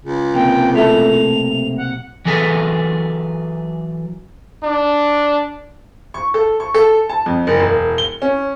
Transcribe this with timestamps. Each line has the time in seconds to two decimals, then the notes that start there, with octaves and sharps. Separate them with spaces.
0.03 C#2
0.34 B1 C3 A#3 G5
0.75 A3 E4 A4 F7
1.77 F#5
2.25 E3 F#3 G#4 A4 B4
4.63 D4
6.14 C#6
6.34 A4
6.60 C#6
6.75 A4
7.09 A5
7.26 F2
7.47 F#1
7.60 E1
7.98 G7
8.22 C#4